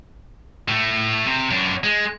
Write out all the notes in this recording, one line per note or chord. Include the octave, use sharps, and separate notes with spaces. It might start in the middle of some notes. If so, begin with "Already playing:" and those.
A2 A3
C3
F#2 D4
G#3